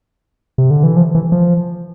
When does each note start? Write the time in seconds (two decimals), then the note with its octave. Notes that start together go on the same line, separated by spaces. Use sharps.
0.58 C3
0.70 D3
0.83 E3
0.96 F3
1.15 E3
1.32 F3